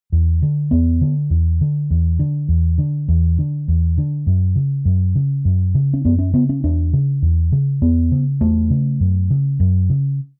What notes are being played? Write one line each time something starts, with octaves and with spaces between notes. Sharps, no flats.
E2
D3
E2 B3
D3
E2
D3
E2
D3
E2
D3
E2
D3
E2
D3
F#2
C#3
F#2
C#3
F#2
C#3
C#4
F#2 B3
C#4
C#3 B3
C#4
E2 D4
C#3
E2
C#3
E2 B3
C#3
E2 A3
C#3
F#2
C#3
F#2
C#3